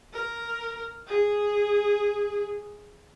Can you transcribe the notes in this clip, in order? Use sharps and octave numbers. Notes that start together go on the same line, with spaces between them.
A#4
G#4